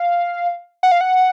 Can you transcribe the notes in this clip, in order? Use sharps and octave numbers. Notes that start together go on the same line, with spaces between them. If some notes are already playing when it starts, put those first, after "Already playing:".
Already playing: F5
F#5
F5
F#5